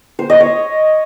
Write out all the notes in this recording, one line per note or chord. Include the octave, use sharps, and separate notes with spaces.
C5
D#5
C#5